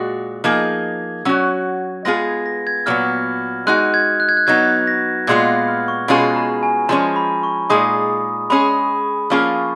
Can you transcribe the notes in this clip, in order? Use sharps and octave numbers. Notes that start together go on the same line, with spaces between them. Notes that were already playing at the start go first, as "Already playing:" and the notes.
Already playing: A#2 G#3 F#4
F3 A#3 D#4 G#4 G#6
F#3 C#4 F#4
G#3 B3 F4 G#4 A#6
G#6
A#6
G#6
A#2 F#3 B3 F6
G#3 D#4 F#4 F#6
G#6
F#6
G#6
F#6
F#3 B3 D#4 G#6
A#6
A#2 G#3 B3 F4 G#6
F6
C#6
B2 G#3 C#4 F4 G#4 B5
A#5
G#5
F3 G#3 C#4 A#5
B5
C#6
A#2 G#3 D#4 G#4 D#6
G#3 C#4 G#4 B5
F3 A#3 C#4 F4 G#4 C#6